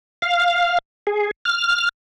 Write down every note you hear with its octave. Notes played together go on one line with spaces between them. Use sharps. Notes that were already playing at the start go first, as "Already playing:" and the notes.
F5
G#4
F6